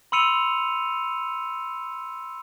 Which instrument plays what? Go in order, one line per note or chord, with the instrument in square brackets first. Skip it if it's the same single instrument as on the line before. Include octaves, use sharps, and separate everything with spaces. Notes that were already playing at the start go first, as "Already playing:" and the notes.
[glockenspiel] B5 C6 E6 C#7 D#7 F7